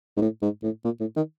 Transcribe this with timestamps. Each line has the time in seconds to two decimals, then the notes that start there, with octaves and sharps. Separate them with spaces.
0.17 G#2
0.21 A2
0.42 G#2
0.63 A2
0.84 A#2
1.00 A2
1.16 D#3